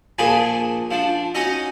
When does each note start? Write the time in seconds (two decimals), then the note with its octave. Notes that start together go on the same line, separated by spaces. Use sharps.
0.19 A#2 F3 D4 G#4 B4 G#5
0.91 F3 D4
1.35 C#4 D#4 F#4 D#5